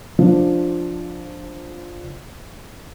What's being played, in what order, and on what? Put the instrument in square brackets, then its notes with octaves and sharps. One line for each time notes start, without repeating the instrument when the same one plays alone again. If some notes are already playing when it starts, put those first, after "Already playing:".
[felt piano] F3 D4